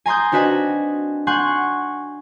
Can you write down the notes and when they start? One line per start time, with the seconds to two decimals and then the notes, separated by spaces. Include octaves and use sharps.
0.06 G#5 A#5 C6 D#6 G6
0.32 C4 D4 F#4 B4 D#5 G#5
1.27 F#5 G#5 C6 C#6 F#6 G6